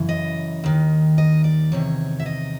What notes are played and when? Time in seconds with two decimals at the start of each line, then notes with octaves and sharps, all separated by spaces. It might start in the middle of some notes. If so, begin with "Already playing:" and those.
Already playing: F#2 C#3 E3
0.09 D#5
0.64 D#2 D#3
1.18 D#5
1.44 D5
1.72 E2 C3 D#3 C#5
2.20 E5
2.26 D#5